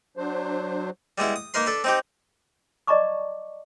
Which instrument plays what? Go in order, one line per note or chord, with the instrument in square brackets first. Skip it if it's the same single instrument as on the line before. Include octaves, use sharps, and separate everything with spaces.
[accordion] F#3 D4 C5
[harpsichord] G3 G#3 B3 E4
D#6
A#3 D#4 A#4 B4 C6
D4 A4 B4
C4 D#4 G4
[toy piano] D5 D#5 A5 A#5 C#6 D6